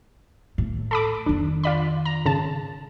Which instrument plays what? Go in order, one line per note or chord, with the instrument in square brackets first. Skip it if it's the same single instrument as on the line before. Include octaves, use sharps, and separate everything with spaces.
[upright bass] A2
[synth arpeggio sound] A4 B5 D6
[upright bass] F2 D#3 [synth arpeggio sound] D4
[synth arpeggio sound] F4 D5 B5
A#5
G#1 C#3 A5